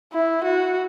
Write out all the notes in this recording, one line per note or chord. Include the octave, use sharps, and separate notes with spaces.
E4
F#4